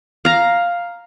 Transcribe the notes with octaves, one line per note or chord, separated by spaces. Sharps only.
F5 A#5